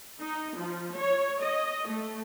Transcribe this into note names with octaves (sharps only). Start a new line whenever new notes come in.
D#4
F3
C#5
D#5
A3